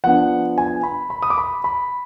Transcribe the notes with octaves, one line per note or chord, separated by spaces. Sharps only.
F3 B3 D4 F#5
G#5
B5
B5
D#6
D6
B5
B5